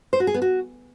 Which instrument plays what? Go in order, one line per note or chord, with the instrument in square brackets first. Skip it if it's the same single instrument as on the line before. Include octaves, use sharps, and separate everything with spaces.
[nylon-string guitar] C5
F#4
G#4
B3
F#4